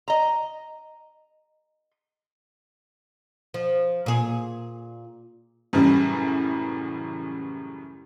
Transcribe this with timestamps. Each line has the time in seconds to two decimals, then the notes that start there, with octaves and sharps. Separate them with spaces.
0.08 D#5 A#5
3.54 F3
4.06 A#2 G#4
5.73 F#2 A2 C#3 E3 G3